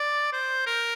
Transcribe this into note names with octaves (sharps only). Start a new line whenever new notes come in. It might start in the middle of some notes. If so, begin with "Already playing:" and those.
Already playing: D5
C5
A#4